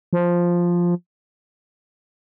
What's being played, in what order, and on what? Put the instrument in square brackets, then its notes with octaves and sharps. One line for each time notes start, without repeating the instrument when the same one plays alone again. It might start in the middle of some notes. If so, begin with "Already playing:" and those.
[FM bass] F3